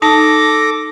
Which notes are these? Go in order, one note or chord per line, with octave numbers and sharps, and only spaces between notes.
D#4 A4 A5 D6 A#6